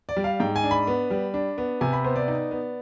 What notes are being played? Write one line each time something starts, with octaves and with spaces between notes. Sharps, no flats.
D5
G3
F5
G#2 G5
G#5
D4
B5
B3
G3
D4
B3
C3 G#5
B5
B3 C5
D5
D#4
B3